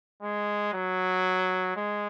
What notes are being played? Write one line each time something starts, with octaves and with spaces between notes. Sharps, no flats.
G#3
F#3
G#3